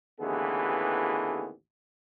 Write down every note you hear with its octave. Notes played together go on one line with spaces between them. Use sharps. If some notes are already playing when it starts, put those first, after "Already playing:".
A1 D#2 D3 E3 B3 G#4